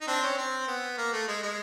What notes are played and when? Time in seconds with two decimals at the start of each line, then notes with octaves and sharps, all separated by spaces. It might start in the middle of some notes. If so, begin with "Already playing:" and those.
0.01 D#4
0.07 C4 D4
0.23 C#4
0.38 C4
0.68 B3
0.98 A#3
1.13 A3
1.28 G#3
1.43 G#3